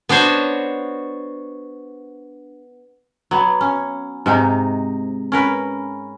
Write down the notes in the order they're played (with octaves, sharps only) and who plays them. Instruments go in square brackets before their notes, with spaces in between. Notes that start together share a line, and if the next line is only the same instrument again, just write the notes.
[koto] B3 D4 F#4 C5 C#5
[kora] F#3 B3
C#4
G#2 C3 D#4
C#4 A#4 B4